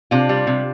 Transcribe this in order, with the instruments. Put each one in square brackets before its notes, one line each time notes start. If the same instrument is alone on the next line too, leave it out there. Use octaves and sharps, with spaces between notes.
[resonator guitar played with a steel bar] C3 D4 F4
G3
C3